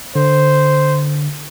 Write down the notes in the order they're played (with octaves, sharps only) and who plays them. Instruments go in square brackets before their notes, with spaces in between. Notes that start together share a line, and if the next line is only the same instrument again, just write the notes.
[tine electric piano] D3 [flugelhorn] C5